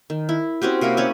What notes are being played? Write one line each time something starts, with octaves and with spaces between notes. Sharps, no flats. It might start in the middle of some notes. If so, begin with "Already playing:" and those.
D#3
E4
C4 C#4 F#4 G4
C3 A#3 E4 A#4
C#4 G4 C#5 D5